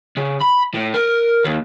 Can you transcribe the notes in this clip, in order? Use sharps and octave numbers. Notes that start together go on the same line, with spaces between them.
C#3
B5
A2
A#4
D#2